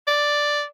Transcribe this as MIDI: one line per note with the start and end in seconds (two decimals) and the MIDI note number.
0.07 0.64 74